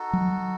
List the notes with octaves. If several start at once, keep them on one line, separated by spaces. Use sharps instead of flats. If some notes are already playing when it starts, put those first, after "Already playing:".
Already playing: D#4 F#4 A4
F#3